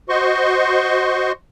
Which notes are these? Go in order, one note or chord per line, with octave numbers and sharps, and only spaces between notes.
F#4 C5 D#5 C6 C#6